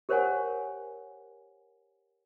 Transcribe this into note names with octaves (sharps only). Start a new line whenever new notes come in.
G4 A#4 C5 C#5 F#5 G#5